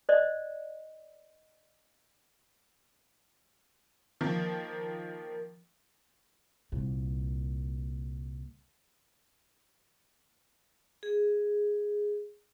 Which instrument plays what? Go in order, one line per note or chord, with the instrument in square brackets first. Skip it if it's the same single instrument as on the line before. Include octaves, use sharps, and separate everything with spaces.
[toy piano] C5 D5 D#5
[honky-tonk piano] D#3 F3 A#3
[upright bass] C2 A#2
[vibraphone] G#4